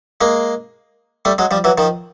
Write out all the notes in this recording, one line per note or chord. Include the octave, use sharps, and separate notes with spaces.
G#3 A#3
G3 A3
F#3 G#3
F3 G3
E3 F#3
D#3 F3